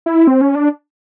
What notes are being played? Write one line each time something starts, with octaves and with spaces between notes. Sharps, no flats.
E4
C4
C#4
D4